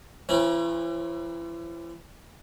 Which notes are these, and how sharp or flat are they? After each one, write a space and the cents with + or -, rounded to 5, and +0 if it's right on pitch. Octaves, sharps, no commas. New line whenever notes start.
E3 +35 C#4 -45 B4 -40